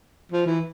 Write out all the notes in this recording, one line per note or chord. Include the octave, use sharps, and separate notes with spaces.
F3
E3